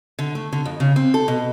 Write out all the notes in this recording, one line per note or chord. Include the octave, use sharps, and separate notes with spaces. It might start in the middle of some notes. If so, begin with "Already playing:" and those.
D3
A3
D3
F2
C#3
C4
A4
B2